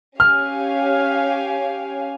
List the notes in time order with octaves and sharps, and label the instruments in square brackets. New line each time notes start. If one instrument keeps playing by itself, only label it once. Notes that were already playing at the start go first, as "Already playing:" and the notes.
[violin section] C#4 G4 C#5 F5 G#5 [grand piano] F6